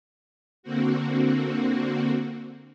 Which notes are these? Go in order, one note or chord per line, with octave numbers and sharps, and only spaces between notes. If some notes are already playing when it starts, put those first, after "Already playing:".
D3 A#3 C4 F#4